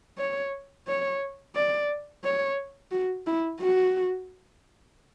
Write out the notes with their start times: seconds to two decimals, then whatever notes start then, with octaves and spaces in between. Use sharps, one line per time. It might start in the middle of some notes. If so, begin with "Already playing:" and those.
0.19 C#5
0.88 C#5
1.55 D5
2.24 C#5
2.92 F#4
3.27 E4
3.60 F#4